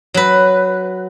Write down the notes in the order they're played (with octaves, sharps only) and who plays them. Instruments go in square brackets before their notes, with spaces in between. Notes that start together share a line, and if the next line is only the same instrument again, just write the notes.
[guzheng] F#3 B4